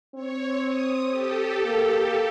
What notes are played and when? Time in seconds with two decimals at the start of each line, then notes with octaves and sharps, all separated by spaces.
0.15 C4 C#5
0.64 D#6
1.08 G4 A4
1.64 A#3